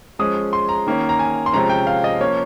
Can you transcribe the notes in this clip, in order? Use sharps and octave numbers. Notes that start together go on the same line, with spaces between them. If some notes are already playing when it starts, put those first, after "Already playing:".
F3 G#3 C#4 D#6
C6
A#5
D#3 A#3 C#4
A#5
G#5
C6
C3 F3 G#3 C#4 A#5
G5
F5
D#5
F3 A#3 C#4 C#5